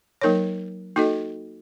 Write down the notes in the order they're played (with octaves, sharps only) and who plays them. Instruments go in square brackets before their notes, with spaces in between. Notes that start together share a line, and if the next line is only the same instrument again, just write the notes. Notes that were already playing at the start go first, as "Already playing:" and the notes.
[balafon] F#3 A#3 D#4 A#4 C#5
A#3 D#4 F#4 A4 D#5